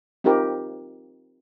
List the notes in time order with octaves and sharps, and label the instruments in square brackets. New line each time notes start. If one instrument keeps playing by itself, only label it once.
[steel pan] C4 D#4 F4 G4 A#4